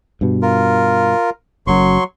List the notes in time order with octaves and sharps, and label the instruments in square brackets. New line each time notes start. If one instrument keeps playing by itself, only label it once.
[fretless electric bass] G2 B2
[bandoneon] F4 A#4
[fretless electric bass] F#1 F#2 [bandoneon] F#3 C6 C#6